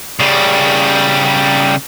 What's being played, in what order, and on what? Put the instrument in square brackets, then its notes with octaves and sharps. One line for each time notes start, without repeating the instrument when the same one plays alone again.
[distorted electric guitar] C#3 G3